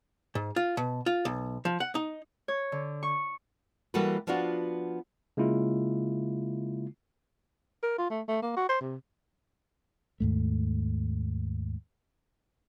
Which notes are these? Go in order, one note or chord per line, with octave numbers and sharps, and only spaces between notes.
G#2
F4
B2
F4
B1
F3
F#5
D#4
C#5
D3
C#6
E3 G3 A#3 F#4 A4 B4
F3 B3 D4 F4 F#4
C#3 G#3 A#3 E4 F4
A#4
F4
A3
A3
A#3
F#4
C5
C3
D#2 G#2 A3